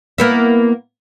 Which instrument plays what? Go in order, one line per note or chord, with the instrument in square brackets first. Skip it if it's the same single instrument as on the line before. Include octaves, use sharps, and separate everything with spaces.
[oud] A#3 B3 E4